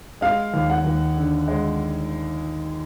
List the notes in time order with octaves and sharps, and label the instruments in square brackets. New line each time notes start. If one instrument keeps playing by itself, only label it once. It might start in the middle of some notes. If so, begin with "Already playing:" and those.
[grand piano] G#3 [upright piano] F5
[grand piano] D#2
[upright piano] F#5
[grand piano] D#2
D3
G#3